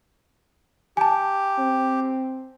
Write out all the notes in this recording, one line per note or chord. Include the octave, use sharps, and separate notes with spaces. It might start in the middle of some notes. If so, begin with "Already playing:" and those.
G4 G#5 A5
C4